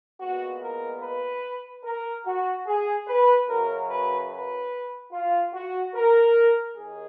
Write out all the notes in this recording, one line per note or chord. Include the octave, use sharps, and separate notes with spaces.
A#2 G#3 B3 F#4
A#4
B4
A#4
F#4
G#4
B4
F#2 C#3 F#3 A#4
B4
B4
F4
F#4
A#4
D#2 D#3 G#4